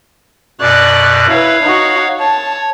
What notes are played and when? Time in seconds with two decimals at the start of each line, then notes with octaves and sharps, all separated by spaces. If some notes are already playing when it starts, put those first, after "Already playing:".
0.61 F#2 B2 D5 F#6
1.29 E4 B4 C#5 F5
1.62 D#4 F#4
2.19 C#5 A5